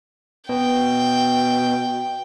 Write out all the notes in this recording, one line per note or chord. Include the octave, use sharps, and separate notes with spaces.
B2 G5